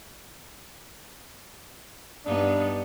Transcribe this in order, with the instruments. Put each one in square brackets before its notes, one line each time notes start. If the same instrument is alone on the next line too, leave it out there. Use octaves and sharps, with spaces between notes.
[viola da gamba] G2 B3 D#4 [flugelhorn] D4